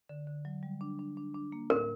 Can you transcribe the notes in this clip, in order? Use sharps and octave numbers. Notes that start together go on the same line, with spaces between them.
D3
D3
F#3
G3
D4
D4
D4
D4
A#3
A2 A#4